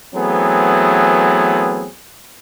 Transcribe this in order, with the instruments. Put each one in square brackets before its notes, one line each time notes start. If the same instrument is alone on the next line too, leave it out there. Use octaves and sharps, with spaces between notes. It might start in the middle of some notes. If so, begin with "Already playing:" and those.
[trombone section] E3 F#3 A3 B3 C4 G#4